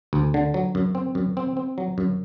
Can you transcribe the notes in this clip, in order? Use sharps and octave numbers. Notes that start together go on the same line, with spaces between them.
D2
D3
F#3
F#2
C4
F#2
C4
C4
F#3
F#2